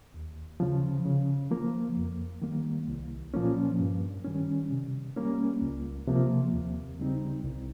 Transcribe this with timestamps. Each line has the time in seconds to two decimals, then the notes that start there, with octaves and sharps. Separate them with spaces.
0.14 D#2
0.60 C#3 F3
1.05 C#3
1.51 F3 A#3
1.96 F2
2.42 D#3 G3 A#3
2.88 C2
3.34 A#2 F3 A#3 C#4
3.80 G2
4.25 D#3 G3 C#4
4.70 C3
5.16 G3 A#3 C#4
5.62 C#2
6.07 C3 F3 A#3
6.53 D#2
6.99 C#3 G3 C4 D#4
7.44 C2